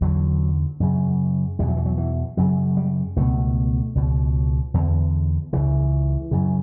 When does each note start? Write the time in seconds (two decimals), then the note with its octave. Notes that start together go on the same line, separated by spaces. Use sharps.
0.01 E2 D3 F#3
0.80 F#2 C#3
1.59 E2 B2 G3
1.68 F#3
1.77 E3
1.86 F#3
1.98 E3
2.37 F#2 C#3 F#3
2.77 G3
3.17 C#2 B2 A3
3.95 C#2 B2
4.74 E2 D3
5.53 C#2 C#3 E3
6.31 F#2 C#3